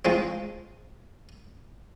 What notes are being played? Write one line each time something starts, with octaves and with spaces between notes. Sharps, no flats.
F3 G#3 C4